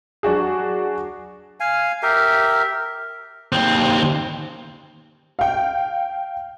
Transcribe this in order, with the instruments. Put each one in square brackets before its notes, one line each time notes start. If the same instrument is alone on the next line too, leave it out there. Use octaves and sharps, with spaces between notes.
[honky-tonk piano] F#3 D4 F#4 G#4
[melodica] F5 G#5
G4 A#4 E5
[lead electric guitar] D#2 C4
[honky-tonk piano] F5 G5